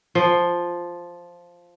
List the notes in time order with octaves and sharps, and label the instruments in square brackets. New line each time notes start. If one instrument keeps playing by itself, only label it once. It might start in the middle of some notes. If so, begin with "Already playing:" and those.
[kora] F3